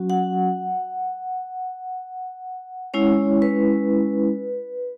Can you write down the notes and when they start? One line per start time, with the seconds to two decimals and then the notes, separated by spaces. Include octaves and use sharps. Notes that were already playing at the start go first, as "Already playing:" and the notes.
Already playing: F#3 C#4 F#4
0.10 F#5
2.94 G#3 C#4 E4 C#5
3.42 B4